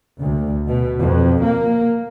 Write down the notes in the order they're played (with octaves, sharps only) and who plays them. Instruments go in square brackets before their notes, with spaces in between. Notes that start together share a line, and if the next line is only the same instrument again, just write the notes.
[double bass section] D2
B2
F2
A#3